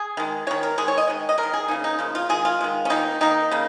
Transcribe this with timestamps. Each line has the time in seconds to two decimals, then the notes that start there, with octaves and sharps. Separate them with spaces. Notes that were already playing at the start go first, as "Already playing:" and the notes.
Already playing: G#4
0.17 D#3 G#3
0.47 D#3 G#3 C#5
0.63 A#4
0.78 D#3 G#3 G#4
0.88 C#5
0.98 D#5
1.08 D#3 G#3
1.29 D#5
1.38 G#3 A#4
1.43 D#3
1.53 G#4
1.68 C#3 F3 A#3 D#4
1.84 D#4
1.99 C#3 F3 A#3
2.15 F4
2.29 D#3 G#3 G#4
2.45 F4
2.61 D#3 G#3
2.85 C#4
2.90 D#3 A#3 D#4
3.21 D#3 A#3 D#4
3.51 C#3 A#3